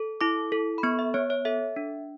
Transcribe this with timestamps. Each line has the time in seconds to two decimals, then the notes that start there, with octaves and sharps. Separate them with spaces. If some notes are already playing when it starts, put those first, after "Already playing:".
Already playing: A4
0.21 E4 D6
0.52 A4
0.78 B5
0.83 B3 C#6
0.99 E5
1.14 B3 C#5
1.30 C#5
1.45 A4 E5
1.76 D4